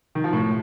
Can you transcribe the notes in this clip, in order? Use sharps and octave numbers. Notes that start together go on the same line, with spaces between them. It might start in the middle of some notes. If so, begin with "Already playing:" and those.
D#3
F3
A2